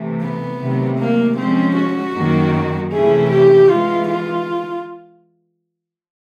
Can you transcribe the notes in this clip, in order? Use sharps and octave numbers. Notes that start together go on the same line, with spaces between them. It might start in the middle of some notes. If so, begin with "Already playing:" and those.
Already playing: C3 E3 A3
B3
C3 D#3 F#3 A3
A#3
F3 G#3 C4 C#4
F#4
F#2 D#3 F#3 A#3
C3 E3 A3 C#4 E4 G#4
G4
E3 G#3 B3 F4
F4